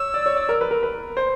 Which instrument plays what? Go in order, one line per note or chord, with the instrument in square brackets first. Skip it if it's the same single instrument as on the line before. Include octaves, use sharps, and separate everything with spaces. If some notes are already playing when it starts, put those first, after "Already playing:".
Already playing: [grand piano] C#5 [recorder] E6
[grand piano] D5
C#5
D5
A#4
B4
A#4
B4
C5